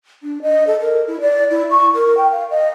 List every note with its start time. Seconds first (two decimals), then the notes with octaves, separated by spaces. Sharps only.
0.23 D4
0.42 D#5
0.67 A4
0.81 A#4
1.08 E4
1.21 D5
1.50 E4
1.71 C#6
1.94 A#4
2.17 G5
2.32 F5
2.50 D#5